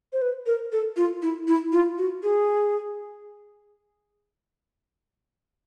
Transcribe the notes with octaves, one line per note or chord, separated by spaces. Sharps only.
C5
B4
A#4
A4
F4
E4
E4
F4
F#4
G#4